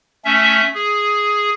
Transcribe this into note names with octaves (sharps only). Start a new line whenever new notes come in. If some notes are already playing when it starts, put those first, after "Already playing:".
A3 C#4 E5
G#4